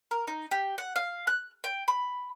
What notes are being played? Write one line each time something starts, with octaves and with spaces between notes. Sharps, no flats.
A#4
D#4
G4
F#5
F5
F#6
G5
B5